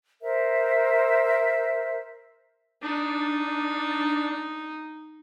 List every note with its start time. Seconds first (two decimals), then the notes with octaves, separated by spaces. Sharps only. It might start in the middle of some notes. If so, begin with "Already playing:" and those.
0.22 A#4 C5 E5
2.83 D4 D#4